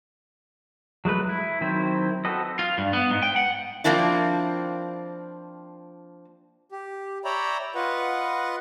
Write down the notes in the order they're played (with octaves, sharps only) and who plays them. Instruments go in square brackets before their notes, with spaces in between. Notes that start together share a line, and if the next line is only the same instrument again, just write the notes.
[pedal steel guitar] F#3 G#3 A3 B4
E4
D#3 F#3 C4 E4 C5
C4 F#4 A4 B4 D#5
[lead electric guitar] F4
G2
B3
G#2
G5
F#5
[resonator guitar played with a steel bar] F3 A#3 C4 D4 E4
[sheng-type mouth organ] G4
C#5 D5 E5 G5 A#5 B5
F4 B4 D#5 F#5